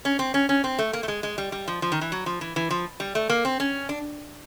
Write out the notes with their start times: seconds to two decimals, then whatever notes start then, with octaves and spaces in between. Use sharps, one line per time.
0.05 C#4
0.19 C4
0.34 C#4
0.49 C#4
0.64 C4
0.79 A3
0.93 A#3
1.03 A3
1.08 G#3
1.23 G#3
1.38 G3
1.52 G3
1.68 F3
1.82 F3
1.92 D#3
2.01 E3
2.12 F#3
2.26 F3
2.41 E3
2.56 E3
2.71 F3
3.00 G3
3.15 A3
3.30 A#3
3.45 C4
3.60 C#4
3.89 D4